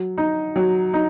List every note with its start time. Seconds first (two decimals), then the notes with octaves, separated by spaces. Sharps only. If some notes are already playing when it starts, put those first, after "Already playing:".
Already playing: F#3
0.18 D#4
0.56 F#3
0.94 D#4